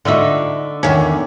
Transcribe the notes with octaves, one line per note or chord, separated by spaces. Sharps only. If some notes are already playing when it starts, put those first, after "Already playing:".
D3 D#4 F4 F#4 E5
E2 D#3 C#4